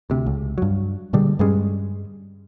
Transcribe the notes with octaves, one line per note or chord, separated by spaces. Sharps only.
D2 C3
C#2
G2 F#3
A#2 D3 G3 G#3
G2 G3 G#3 C#4